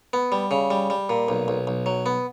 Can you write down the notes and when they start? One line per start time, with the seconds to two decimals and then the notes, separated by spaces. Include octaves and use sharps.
0.13 B3
0.32 G3
0.51 C#3
0.70 G3
0.90 G3
1.09 A#2
1.29 B1
1.48 B1
1.67 B1
1.86 F#3
2.06 B3